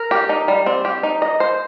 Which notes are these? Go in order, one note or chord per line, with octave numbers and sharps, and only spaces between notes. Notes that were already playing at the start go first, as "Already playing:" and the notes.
Already playing: A#4
G4
D#4
G3
C4
G4
D#4
D#5
C5